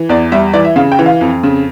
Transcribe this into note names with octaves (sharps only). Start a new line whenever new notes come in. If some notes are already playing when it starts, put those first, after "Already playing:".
Already playing: E3
E2 D5
G3 E5
E3 D5
E5
C#3 F5
G5
E3
F5
F2
C#3